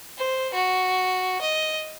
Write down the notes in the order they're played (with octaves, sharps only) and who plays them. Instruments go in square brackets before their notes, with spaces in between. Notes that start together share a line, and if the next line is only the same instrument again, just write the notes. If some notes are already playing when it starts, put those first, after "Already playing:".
[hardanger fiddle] C5
F#4
D#5